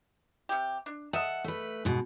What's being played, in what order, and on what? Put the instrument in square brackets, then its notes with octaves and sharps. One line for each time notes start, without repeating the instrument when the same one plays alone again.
[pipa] C3 G4
D4
[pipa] A4 D#5 E5 [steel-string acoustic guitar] F#5
[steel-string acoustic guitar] A3 B4
G#2 B2